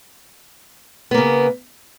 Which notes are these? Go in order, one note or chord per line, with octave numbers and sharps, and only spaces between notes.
C#3 A#3 B3